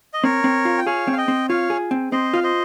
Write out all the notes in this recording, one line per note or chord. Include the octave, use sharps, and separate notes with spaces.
D#5
C4 A#4 C#5
C4
F4
G5
G#4 C#5 F5
C4
F5
D#5 G5
C4
F4 C#5 F5
G#4
C4
C4 C5 D#5
F4 F5
C5 D#5